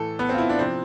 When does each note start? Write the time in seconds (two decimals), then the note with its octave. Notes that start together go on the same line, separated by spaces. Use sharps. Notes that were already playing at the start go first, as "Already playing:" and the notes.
Already playing: A2 E3 A4
0.19 B3
0.29 C4
0.34 F4
0.38 E4
0.49 D4
0.59 C3 F3 C4